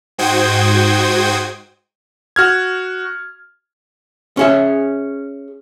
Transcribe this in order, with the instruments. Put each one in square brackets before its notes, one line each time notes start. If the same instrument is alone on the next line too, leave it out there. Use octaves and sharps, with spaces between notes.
[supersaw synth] G#2 F#4 C5 G5 D#6 G#6
[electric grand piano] F#4 F6 G#6
[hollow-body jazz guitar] C#4 G#4 E5